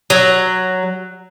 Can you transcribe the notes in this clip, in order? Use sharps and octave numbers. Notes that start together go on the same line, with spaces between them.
F#3